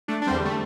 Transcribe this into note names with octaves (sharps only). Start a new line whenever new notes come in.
A3 D4
D4
E2 D3 G3 C4
A3